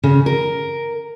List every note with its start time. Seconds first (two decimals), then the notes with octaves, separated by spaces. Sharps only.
0.04 C#3
0.26 A#4